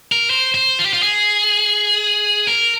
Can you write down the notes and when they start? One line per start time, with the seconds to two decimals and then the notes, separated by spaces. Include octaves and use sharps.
0.12 A#4
0.30 C5
0.54 C5
0.79 F4
0.86 G4
0.93 F4
1.03 G#4
2.47 A#4